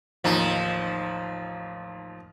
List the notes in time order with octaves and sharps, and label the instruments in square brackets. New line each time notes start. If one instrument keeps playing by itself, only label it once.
[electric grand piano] A1 D#2 [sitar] F3 D#4